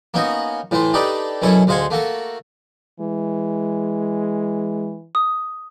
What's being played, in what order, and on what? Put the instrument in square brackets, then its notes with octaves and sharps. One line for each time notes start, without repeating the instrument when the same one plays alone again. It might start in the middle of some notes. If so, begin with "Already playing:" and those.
[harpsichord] A#3 B3 C#4 D#4 F#4
A2 E3 A3 C5
D4 D#4 G4 A4 B4 D5
F#2 B2 C#4 E4 A4 C#5
D2 G#3 C5 F5 F#5 G#5
A3 A#3 F#4 A4
[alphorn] E3 [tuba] G#3
[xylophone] D#6